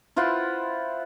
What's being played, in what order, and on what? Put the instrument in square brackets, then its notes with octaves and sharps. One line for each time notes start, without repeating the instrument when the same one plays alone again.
[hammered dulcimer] E4 F4 C5 F#5